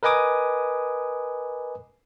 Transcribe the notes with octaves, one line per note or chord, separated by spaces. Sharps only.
A#4 B4 D#5 G#5 D6 D#6